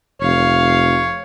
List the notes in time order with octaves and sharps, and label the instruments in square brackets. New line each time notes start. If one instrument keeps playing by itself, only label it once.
[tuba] F1 [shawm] C#5 [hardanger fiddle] F5